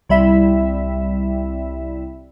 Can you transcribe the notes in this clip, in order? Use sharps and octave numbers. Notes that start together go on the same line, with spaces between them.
C2 G3 E4 E5